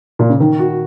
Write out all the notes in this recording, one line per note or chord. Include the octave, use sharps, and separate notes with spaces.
A#2
C#3
D#3
F#4